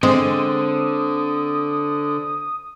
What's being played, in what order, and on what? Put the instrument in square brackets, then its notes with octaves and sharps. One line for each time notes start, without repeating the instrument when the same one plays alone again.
[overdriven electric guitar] D3 [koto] G#3 [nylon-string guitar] C4 [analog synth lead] D#6